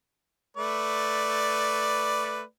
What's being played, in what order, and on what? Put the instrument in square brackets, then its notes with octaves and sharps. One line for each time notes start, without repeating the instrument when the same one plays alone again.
[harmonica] A3 B4 D5